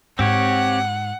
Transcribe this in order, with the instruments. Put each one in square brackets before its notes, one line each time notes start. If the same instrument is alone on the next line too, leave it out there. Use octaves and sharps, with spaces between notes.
[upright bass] G#2 [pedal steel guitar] C4 G4 C#5 [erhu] F#5